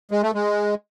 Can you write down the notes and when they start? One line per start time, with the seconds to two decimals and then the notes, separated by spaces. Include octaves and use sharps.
0.11 G#3
0.23 A3
0.34 G#3